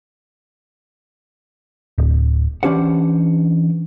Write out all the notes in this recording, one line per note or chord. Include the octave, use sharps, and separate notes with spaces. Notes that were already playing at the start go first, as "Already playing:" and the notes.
D1
E3 C#4 D4 G4 C5 F#5